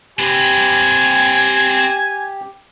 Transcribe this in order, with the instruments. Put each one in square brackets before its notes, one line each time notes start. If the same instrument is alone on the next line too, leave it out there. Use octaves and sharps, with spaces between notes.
[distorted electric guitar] C4 B4 [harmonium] G4 [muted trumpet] G#5